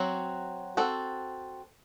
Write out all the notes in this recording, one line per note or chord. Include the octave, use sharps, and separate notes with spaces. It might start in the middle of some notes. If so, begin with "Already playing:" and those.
Already playing: F#3 C4 F#4
C4 F#4 A4